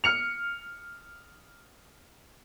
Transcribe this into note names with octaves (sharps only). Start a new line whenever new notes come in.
F6 C#7 F7